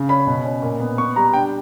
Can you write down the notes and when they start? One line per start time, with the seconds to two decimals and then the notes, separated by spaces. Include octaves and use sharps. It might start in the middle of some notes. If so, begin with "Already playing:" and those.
Already playing: C#3
0.09 C#4 B5
0.27 B2
0.45 C#4
0.62 A#2
0.80 B3
0.98 B3 C#6
1.16 G3 A#5
1.33 D4 G5